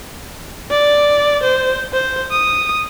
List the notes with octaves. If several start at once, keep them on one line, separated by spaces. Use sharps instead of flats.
D5
C5
C5
D#6